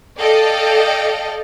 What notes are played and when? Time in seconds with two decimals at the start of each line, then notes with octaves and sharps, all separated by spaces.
0.17 A4 D5 D#5 F5 G5